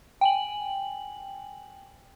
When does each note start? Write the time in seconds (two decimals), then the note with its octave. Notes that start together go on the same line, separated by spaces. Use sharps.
0.21 G5 G#5 F#7